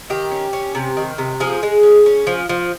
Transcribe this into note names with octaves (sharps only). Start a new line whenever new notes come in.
D#3 G4
C#4
C#4
C3
D#3
C3
F3 G#4
G#3
C#4
C#4
F3
F3